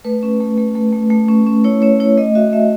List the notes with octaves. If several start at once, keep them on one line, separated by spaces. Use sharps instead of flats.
A3 B4
C#4
A3
A3
A3
A3
A3
C#4
C#4
E4 C#5
C#4 C#5
E4 C#5
A3 D#5
F#4 E5
A3 E5